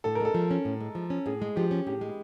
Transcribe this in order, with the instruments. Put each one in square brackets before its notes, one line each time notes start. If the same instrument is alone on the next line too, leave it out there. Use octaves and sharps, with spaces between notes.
[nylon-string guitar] A2 [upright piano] A4
[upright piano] A#4
[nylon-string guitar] G#3 [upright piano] A4
[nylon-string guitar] F3
C#4
A2
G#3
F3
C#4
[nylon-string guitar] A2 [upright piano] G#4
[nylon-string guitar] G#3
[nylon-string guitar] F3 [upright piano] G4
[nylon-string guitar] C#4
[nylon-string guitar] A2 [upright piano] G4
[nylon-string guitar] G#3